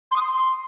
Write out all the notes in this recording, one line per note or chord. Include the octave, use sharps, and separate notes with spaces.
C6
D#6
C6